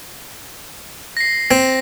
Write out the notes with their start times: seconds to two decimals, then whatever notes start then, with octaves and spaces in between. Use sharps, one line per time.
1.17 A#6 C7
1.51 C4